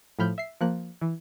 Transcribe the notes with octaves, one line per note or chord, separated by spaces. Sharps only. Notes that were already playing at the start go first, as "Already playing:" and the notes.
A2 F3 B5 F6 G6
E5 C7
F3 A#3 F#6
E3